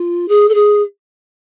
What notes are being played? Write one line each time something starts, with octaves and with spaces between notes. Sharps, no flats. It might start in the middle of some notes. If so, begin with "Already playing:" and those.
Already playing: F4
G#4
A4
G#4